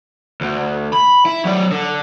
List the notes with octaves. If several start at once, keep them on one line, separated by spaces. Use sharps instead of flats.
D2
B5
E4
F#3 D5
D3